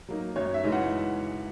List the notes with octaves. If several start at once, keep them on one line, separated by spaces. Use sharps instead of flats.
F#3 A#3 D#4
F#2 C#5
E5
C#3 E3 G#3 D#4
F#5